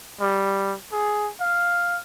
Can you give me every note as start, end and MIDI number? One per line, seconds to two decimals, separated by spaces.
0.21 0.75 55
0.92 1.29 68
1.41 2.01 77